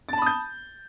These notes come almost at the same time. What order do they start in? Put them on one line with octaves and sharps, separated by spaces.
A6 A5 B5 D#6 G6